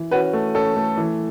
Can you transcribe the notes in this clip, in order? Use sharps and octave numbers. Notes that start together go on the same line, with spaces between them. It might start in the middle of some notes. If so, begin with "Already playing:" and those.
Already playing: E3
C#4 F#4 B4
A3
C#4 A4
A3
E3